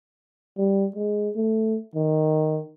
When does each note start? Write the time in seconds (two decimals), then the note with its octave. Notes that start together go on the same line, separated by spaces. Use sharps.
0.58 G3
0.96 G#3
1.36 A3
1.95 D#3